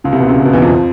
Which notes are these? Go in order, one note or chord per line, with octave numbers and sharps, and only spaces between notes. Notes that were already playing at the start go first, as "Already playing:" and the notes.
C#2 C#3
C2 C3
B2
C#2 C#3
B2
E2 E3
F2 F3